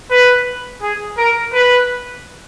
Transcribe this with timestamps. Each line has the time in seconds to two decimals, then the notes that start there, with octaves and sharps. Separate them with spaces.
0.10 B4
0.82 G#4
1.17 A#4
1.53 B4